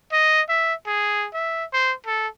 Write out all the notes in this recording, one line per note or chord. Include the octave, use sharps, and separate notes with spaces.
D#5
E5
G#4
E5
C5
A4